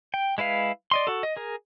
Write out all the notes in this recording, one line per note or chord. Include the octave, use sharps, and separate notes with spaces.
G5
G#3 E4 B4 F5
D5 D#5 C6
F#4 A4
D#5
G#4 A#4